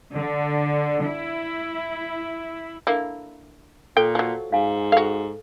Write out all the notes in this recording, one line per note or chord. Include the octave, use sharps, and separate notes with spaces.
D3
E4
D3 A#3 E4
A#2 A4 G5
F3 F#3
G#2 F5 G#5
F#4 A4 F5